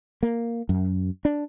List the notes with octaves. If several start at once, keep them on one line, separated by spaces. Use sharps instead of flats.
A#3
F#2
D4